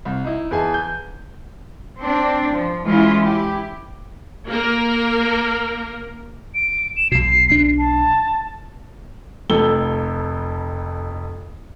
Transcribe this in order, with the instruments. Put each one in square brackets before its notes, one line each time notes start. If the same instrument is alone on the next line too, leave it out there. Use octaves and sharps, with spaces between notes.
[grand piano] C2
D#4 E4
E2 G#4 G#5 A5
G6
[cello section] C4 D4
F3
E3 G#3 C#4 E4 F4
E4 G4
[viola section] A#3 A#4
[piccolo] D7
E7
[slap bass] B1 B2 [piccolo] C7
[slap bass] B1 D4
[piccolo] A5
[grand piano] F1 F2 A4 G7